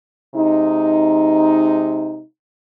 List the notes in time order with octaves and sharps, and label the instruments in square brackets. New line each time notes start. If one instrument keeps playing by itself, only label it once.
[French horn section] C3 G#3 D#4